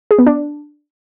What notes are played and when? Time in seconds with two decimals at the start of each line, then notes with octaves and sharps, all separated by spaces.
0.11 G#4
0.19 B3
0.26 D4